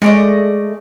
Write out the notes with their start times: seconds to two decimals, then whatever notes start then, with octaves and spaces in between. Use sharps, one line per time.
0.02 G#3 A3 D5 D#5